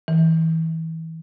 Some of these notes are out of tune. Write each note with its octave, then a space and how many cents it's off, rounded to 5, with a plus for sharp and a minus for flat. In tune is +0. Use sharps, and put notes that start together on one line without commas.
E3 -30